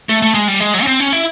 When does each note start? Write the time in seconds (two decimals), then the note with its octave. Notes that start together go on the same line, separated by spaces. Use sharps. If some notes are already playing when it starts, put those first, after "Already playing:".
0.09 A3
0.22 A3
0.35 G#3
0.48 G3
0.60 G#3
0.74 F#3
0.82 C#4
0.87 C4
1.00 C#4
1.13 E4